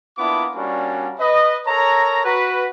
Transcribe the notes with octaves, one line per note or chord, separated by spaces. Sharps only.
A#3 B3 D4 E4 F4 D6
G3 A#3 C#4 D4 F#4
B4 D#5
A4 A#4 C#5 A#5
F#4 B4